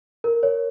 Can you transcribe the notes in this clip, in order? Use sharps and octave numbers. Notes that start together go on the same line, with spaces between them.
A#4
C#5